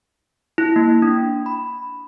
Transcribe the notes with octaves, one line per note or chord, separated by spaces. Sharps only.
E4
A#3
D4
B5